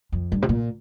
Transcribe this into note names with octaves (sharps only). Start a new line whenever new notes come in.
F2
G2
C3
A#2